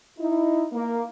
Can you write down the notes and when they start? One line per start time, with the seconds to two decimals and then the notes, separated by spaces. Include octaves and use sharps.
0.19 D#4 E4
0.72 A#3